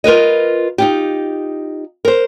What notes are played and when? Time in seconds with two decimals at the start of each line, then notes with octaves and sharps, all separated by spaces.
0.04 F4 A#4 B4 D#5
0.78 D#4 F4 G4
2.05 A#4 C5